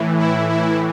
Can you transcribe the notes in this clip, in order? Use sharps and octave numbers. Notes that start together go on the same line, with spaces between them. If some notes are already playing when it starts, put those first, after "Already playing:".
Already playing: A2 E3
E4
E4